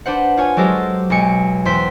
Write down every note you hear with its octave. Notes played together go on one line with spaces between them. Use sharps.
D4 B4 C5 F#5
F4 C#5 G#5
F#3 G#3 G4 A4 A#4 C5
B1 G#3 G#5 C#7 D7
E2 C5 G5 C6 B6